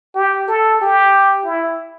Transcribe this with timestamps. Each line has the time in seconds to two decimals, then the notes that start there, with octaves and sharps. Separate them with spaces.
0.15 G4
0.48 A4
0.82 G4
1.46 E4